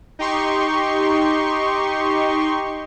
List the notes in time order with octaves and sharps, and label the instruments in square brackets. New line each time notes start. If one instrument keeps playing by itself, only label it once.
[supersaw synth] D#4 G4 C6 C#6